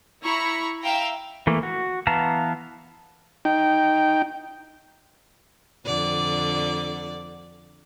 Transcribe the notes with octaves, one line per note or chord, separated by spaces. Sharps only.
E4 A#5 B5 C#6
E5 F5 G5 A#5
E3 A3 A#3
F#4
E3 B3 F5 A5 A#5
D#4 G5
F2 D3 D5